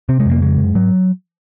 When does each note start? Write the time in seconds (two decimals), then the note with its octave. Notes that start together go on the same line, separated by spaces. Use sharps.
0.09 C3 C4
0.20 G#3
0.26 F2
0.31 A#3
0.42 C#3 G#3
0.59 F#2
0.75 G#2 F#3